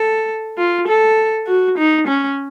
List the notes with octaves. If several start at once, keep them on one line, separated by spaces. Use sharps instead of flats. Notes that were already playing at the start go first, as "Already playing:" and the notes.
Already playing: A4
F4
A4
F#4
D#4
C#4